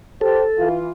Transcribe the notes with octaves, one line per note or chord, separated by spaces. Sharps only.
G4 A4 C5
E3 F4